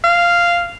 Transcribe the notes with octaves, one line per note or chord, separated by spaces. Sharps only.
F5